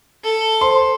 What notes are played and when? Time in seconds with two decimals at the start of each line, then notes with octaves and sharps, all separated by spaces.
0.24 A4
0.61 C5 C6